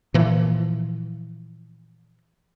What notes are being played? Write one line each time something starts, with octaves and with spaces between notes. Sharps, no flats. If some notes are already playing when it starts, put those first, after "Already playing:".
A#2 E3 F3